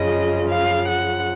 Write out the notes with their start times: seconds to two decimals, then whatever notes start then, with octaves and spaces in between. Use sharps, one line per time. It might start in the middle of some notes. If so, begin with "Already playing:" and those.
Already playing: F#2 C#3 F3 D#5
0.49 F5
0.88 F#5